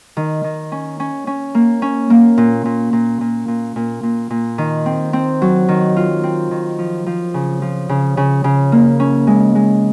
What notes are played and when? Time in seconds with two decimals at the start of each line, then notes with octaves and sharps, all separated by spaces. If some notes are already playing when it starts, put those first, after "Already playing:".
0.17 D#3
0.44 D#3
0.72 C#4
1.00 C#4
1.27 C#4
1.55 A#3
1.82 C#4
2.10 A#3
2.38 A#2
2.65 A#2
2.93 A#2
3.21 A#2
3.48 A#2
3.76 A#2
4.03 A#2
4.30 A#2
4.58 D#3
4.86 C4
5.13 C4
5.42 F#3
5.69 D#3
5.96 F4
6.23 C4
6.51 D#3
6.78 F3
7.06 F3
7.34 C#3
7.62 F3
7.89 C#3
8.17 C#3
8.44 C#3
8.72 A#3
9.00 C#4
9.27 G#3
9.55 G#3